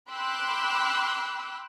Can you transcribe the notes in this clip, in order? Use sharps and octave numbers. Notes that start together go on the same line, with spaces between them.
G5 B5 C6 D6 E6 F#6